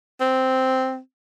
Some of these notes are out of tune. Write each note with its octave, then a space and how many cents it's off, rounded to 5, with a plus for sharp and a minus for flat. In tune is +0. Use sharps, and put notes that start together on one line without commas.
C4 -5